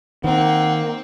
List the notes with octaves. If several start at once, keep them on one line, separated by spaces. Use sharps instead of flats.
D#3 A#3 C4 F#5